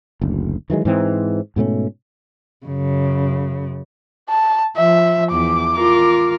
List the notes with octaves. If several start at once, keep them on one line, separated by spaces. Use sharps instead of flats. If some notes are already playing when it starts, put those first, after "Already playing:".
F#1 D2
D#3 E3 F#3 G#3
G#2 E3 C4
G#2 B2 A3 C#4
F#2 C#3
A5
F3 E5
E2 E3 D6
F4 A#4